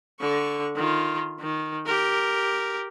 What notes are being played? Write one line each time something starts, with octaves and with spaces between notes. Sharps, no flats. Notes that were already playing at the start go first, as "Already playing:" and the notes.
D3 C#6
D#3 F4
D#3
G4 A#4